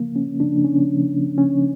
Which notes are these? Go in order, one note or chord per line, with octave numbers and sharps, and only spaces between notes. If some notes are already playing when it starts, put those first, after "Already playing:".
Already playing: C#3 F3 A#3
C#4
C#3 F3 D4
C#4
C#3 F3
C#3 F3 C#4